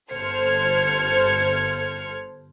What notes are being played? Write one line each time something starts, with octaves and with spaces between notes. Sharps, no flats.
G1 A4 C5 F6 G#6 C#7